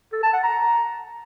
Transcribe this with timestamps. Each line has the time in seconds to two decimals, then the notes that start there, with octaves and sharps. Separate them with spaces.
0.13 A4
0.23 A5
0.33 F#5
0.43 A#5